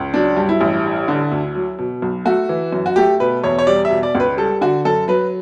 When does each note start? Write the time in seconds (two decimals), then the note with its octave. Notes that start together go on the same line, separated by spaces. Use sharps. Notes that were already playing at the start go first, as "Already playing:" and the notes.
Already playing: C#2
0.14 F#3 D4
0.37 G2
0.49 E4
0.61 A1
0.84 G3
1.08 D3
1.32 D2
1.55 F#3
1.78 B2
2.02 B1
2.25 A3 F#4
2.49 E3
2.72 F#2
2.86 F#4
2.96 A3 G4
3.20 B2 B4
3.43 E2 C#5
3.58 C#5
3.67 G3 D5
3.85 E5
3.90 B2
4.03 D5
4.15 C#2
4.20 B4
4.37 G3 A4
4.61 D3 F#4
4.85 F#2 A4
5.08 F#3 B4